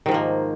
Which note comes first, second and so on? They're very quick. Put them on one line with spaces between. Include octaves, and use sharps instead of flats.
D#3 G#2 F3 A#3